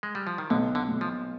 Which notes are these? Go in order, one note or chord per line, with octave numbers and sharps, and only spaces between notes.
G#3
G3
F3
D#3
B1 D3
D3
B1
F3